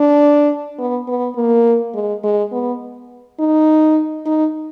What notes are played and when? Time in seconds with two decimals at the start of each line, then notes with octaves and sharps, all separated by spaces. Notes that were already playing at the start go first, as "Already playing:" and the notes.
Already playing: D4
0.79 B3
1.08 B3
1.36 A#3
1.94 G#3
2.24 G#3
2.52 B3
3.39 D#4
4.26 D#4